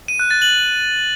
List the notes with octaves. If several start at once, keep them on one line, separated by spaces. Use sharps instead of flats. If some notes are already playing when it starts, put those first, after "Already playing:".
D#7
F#6
A6
F#7